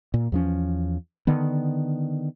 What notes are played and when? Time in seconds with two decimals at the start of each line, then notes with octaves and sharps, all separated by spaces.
0.14 A#2
0.32 E2 F3 C#4
1.27 D3 D#3 B3